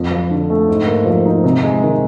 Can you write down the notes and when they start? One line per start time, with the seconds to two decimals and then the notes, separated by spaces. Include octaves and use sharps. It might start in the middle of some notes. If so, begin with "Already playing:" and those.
Already playing: F2
0.11 F3
0.30 D3
0.50 A3
0.68 G#2
0.87 A#3
1.06 F3
1.26 D#4
1.44 C3
1.63 G#3
1.83 D#3